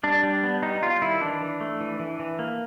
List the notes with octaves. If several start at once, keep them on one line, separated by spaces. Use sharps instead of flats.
G3 D4
G3
B3
G3 D#4
G3 F4
D#3 E4
E3 D4
E3
A3
E3
E3
E3
A#3